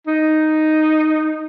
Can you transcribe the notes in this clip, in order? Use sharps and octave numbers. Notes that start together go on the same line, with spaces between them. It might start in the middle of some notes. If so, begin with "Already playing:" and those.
D#4